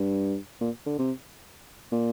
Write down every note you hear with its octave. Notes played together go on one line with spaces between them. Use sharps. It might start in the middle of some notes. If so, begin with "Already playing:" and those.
Already playing: G2
A#2
D3
C3
A#2